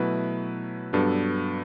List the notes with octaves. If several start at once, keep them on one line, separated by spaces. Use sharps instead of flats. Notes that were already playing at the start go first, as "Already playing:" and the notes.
Already playing: B2 F#3 A3 E4 B4
G2 F#3 B3 D4 A4